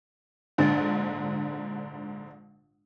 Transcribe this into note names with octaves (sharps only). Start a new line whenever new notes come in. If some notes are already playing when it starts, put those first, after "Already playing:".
A#1 G#2 D3 D4 D#5